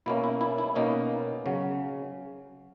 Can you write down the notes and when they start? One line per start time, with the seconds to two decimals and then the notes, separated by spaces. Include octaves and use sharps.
0.06 B2 A#3 C#4 E4
0.24 E4
0.41 E4
0.58 E4
0.75 B2 A#3 C#4 D#4
1.46 C#3 F#3 C#4